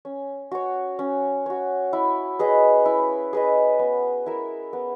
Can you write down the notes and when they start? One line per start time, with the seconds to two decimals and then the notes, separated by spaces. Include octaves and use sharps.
0.05 C#4
0.51 F#4 C#5
0.99 C#4
1.46 F#4 C#5
1.93 E4
2.39 G#4 B4 D#5
2.86 E4
3.33 G#4 B4 D#5
3.79 B3
4.26 E4 A#4 E5
4.73 B3